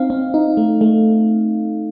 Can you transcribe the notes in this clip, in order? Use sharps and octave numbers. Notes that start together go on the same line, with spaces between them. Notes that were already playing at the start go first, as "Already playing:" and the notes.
Already playing: C4 D#4 F5
C4
D#4
A3
A3